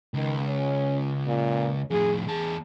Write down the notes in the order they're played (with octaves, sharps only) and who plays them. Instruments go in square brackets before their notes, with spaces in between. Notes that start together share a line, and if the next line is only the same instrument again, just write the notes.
[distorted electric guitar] C#2 [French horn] D#3
[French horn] C#4
A#2
[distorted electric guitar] F2 A2 [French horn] G#4
[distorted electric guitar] E2 A5 [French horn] G#4